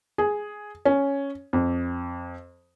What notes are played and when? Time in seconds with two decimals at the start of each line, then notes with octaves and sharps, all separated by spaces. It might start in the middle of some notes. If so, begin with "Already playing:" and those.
0.18 G#4
0.85 C#4
1.53 F2